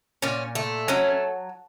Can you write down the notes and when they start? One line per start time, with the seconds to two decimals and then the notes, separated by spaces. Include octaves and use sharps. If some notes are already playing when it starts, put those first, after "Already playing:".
0.22 A#2 C#4
0.55 A3
0.88 F#3 C#4